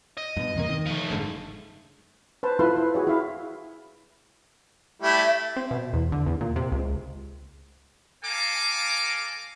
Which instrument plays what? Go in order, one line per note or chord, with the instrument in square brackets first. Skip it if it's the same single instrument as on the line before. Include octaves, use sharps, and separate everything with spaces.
[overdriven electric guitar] D#5
[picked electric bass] G2 B2
E2 C3 A#3
D#3
[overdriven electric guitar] F3 A3
[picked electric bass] F#1 G#2 D3
[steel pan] B4 C5 A5
E4 F4 A4 B4 A5 C6
E4 B4
F#4 G#4 C#5
E4 E5 F5
[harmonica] G3 A3 E4 [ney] E5
[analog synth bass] C4
B2
E2
D3
E2
A#2
C3
C#2
[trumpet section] A4 F5 G#5 A#5 D6